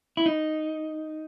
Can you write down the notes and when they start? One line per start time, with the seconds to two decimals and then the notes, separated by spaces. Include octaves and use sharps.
0.17 E4
0.26 D#4